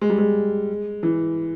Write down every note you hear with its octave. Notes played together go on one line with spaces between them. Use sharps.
G#3
G3
G#3
E3